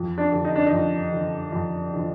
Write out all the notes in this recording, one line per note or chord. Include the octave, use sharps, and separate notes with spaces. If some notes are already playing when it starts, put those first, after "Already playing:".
Already playing: F2
D4
D3 F3
D#4
D4
D#4
F2
D3 F3
F2
D3 F3